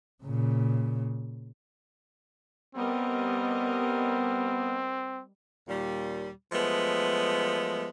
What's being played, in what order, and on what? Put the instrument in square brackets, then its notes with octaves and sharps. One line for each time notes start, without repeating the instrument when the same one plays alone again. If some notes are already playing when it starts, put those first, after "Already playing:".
[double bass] A#2 C#3
[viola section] G3 A#4 D#5 [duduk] B3 [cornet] C4
[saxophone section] D#2 A#2 G3
F3 F#3 G#3 A3 B3